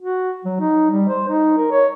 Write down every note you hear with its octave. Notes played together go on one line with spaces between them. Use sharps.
F#4
F#3
D#4
G3
C5
D#4
A#4
C#5